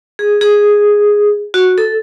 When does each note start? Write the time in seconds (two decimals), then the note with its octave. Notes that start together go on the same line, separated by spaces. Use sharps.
0.19 G#4
0.41 G#4
1.54 F#4
1.78 A4